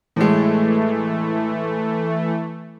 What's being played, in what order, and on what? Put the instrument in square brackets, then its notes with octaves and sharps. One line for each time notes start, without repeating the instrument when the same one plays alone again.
[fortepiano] A2 G#3 [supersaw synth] E3 A3